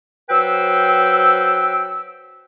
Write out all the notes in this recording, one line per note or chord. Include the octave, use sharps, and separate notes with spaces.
F#3 B4 C5 G5 E6